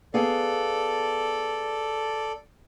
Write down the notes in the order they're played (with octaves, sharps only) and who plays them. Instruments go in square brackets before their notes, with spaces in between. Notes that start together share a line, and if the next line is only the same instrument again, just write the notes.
[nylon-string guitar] B3 G#4 F5 [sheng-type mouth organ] A4 D5